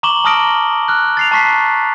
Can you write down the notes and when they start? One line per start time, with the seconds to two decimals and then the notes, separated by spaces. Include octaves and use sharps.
0.03 A#5 C#6 D6 E7 F#7 G7
0.24 A5 A#5 D#6 F6 A#6 D7
0.88 F6 F#6
1.17 A6 C7 F7
1.31 A5 A#5 C#6 B6 C7